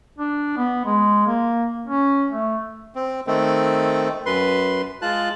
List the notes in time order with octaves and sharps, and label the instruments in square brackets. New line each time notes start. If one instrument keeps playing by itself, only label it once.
[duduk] D4
B3
G#3
A#3
C#4
A3
[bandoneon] C4
D#3 A3 C4
F#2 B4 C6
G#3 F4 A5 F#6